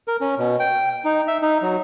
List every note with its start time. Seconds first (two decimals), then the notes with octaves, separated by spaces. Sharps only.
0.08 A#4
0.21 C#4
0.39 B2
0.60 G5
1.05 D#4
1.28 E5
1.42 D#4
1.62 F#3